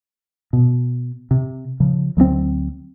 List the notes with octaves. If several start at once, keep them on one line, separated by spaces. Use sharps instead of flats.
B2
C3
C#3 F3
D2 F#3 G3 C4